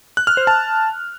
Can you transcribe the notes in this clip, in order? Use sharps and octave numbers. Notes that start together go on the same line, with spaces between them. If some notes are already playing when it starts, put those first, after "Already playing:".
F#6
F6
C5
A5